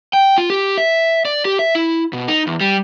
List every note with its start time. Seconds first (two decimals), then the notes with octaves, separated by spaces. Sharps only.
0.13 G5
0.38 F4
0.50 G4
0.77 E5
1.25 D5
1.45 G4
1.59 E5
1.75 E4
2.13 B2
2.28 D#4
2.47 E2
2.61 G3